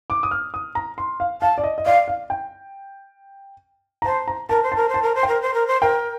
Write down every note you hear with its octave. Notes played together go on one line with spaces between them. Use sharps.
D6
D#6
F6
D#6
A#5
C6
F5
F5 A5
D5
D#5
D#5
D5 F5
F5
G5
A#5
C5 A5
A#5
A#4 A5
C5
A#4 A5
C5
A5
A#4
C5
A#4 G5
C5
A#4
C5
A#4 G5